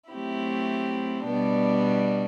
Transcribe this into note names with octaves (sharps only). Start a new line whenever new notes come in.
F#3 A3 C4 E4 G4
B2 G3 B3 D4